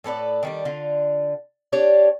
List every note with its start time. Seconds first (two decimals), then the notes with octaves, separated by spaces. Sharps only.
0.04 A2 A4 B4 D5
0.43 D#3 G3 D4
0.65 D3 F4
1.72 D4 G4 C#5 D5